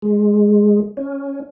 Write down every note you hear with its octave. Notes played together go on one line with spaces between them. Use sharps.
G#3
C#4